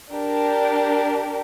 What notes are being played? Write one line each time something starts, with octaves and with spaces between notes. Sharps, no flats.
D4 G4 A#4